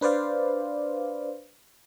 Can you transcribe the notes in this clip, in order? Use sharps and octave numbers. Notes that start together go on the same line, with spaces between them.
D4 B4 C5 D5 F5